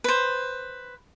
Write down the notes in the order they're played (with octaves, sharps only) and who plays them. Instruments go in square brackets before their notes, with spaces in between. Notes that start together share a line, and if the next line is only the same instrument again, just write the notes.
[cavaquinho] B4 C5